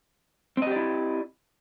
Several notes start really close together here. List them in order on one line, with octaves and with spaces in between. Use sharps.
C4 D#5 G4 D5 E4